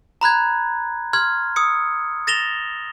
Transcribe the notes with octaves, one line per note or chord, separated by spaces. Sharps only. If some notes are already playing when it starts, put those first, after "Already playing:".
A#5 B5 F#6 G#6
C6 F6 G#6
D#6 E6 C#7
A6 A#6 E7 F7 G7